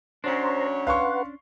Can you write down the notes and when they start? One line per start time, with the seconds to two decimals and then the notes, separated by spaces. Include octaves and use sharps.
0.24 D2 F#3 C#4 D4 C5 C#5 A#5 C6
0.87 B4 F5 F#5 C6 C#6